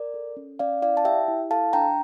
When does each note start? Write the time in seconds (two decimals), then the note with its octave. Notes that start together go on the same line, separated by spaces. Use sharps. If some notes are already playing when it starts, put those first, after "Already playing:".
Already playing: A#4 D5
0.14 A4
0.37 C#4
0.59 C#4 D5 F5
0.82 E4 D5 F5
0.97 A5
1.05 G4 E5 G5
1.28 E4
1.51 A4 F5 A5
1.73 D4 G5 A#5